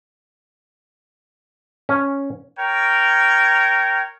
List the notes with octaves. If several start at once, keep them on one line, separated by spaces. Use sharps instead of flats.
C#4
A#4 C#5 G5